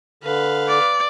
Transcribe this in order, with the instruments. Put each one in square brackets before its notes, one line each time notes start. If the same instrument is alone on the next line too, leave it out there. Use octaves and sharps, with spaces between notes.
[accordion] D3 [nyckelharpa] B4 F5
[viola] D5